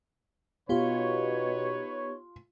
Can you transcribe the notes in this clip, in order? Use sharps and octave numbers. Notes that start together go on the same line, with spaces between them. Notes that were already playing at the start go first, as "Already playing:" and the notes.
B2 B3 D#4 F4 G4 B4 C#5